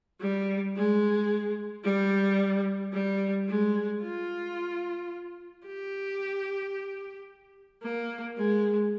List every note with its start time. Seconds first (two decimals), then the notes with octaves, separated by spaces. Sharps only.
0.20 G3
0.76 G#3
1.84 G3
2.93 G3
3.48 G#3
4.02 F4
5.65 G4
7.83 A#3
8.37 G#3